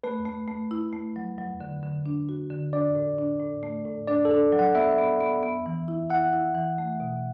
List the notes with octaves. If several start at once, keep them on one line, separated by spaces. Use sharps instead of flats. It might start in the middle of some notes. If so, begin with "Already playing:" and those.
A3 B4
A3
A3
E4
A3
F#3
F#3
D3
D3
D4
F#4
D3
D4 D5
A2
D4
A2
A3
A2
D4 D5
A4
D4
F#3
F#5
B3 E5
B3
B3
B3
E3
E4
E4 F#5
E4
E3
A3
B2